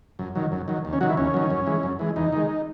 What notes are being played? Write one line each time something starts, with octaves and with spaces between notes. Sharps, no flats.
F#2
D#3 F#3
F#2
D#3 F#3
D#2
C#4
D#3 F#3 F#4
E4
D#2 C#4
D#3 F#3
F#2
E3 G#3
F#2
E3 G#3
E2 D#4
D#3 G#3